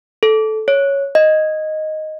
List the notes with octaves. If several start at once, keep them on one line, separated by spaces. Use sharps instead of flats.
A4
C#5
D#5